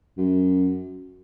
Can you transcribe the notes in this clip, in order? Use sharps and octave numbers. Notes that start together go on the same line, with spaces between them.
F#2